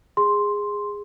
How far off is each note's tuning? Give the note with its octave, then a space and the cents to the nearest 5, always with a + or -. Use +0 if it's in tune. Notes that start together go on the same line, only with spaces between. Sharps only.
G#4 -15 C6 +0